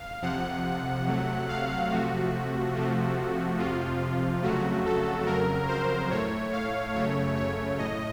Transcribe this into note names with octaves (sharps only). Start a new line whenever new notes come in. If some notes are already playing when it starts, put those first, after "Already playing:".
Already playing: F5
F2 C3 F3 F#5
C3 F#3 A3
F5
C3 F3 A3 F#4
C3 F3 A3
F2 C3 F3 F4
F2 C#3 F#3 A3 F#4
A4
F2 C#3 F#3 A#4
C5
A2 A3 C#5
F5
F#2 C#3 A3 C#5
C#5
A2 D#5